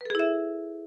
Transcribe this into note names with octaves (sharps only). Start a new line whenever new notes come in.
E4 G#4 A4 B4 E5